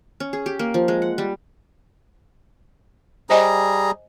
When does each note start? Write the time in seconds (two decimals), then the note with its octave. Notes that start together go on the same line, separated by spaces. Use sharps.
0.20 C#4
0.33 G#4
0.46 G4
0.59 A#3
0.74 F3
0.88 G#3
1.02 F#5
1.18 G3
3.30 G3 G#4 C5 D#5 G#5 A#5